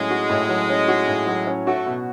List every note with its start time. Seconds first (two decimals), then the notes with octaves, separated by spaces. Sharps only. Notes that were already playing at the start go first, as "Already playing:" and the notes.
Already playing: A2 F#3 G#3 C#4
0.10 F#4
0.30 A2
0.49 F#3
0.69 C#4
0.88 F#4
1.08 A2
1.27 F#3
1.47 C#4
1.66 A3 F#4
1.86 B2